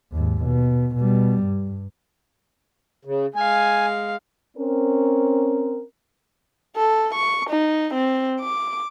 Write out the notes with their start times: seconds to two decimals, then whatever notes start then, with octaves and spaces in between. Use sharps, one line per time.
0.13 D#2 G#2
0.44 B2
0.95 B2 G3
1.44 G2
3.05 C#3
3.36 G#3 F5 G#5
4.56 C4 C#4 A#4
6.76 A4
7.14 C#6
7.50 D#4
7.94 C4
8.41 D6